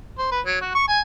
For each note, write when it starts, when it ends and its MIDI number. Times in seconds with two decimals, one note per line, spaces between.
0.18 0.28 72
0.31 0.40 71
0.46 0.58 54
0.61 0.75 66
0.75 0.87 85
0.88 1.01 80